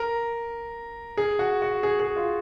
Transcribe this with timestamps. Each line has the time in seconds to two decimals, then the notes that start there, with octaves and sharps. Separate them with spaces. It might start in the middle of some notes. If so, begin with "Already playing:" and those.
Already playing: A#4
1.17 G#4
1.39 F#4
1.62 F#4
1.83 G#4
2.00 G#4
2.16 F4